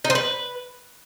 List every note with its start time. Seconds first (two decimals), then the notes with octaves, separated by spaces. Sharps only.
0.05 D#4
0.10 C5
0.15 B4